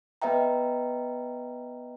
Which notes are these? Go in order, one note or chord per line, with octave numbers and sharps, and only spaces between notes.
B3 B4 D#5 E5 G5 A#5